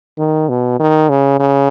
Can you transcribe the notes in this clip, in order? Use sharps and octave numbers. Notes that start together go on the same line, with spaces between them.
D#3
B2
D#3
C#3
C#3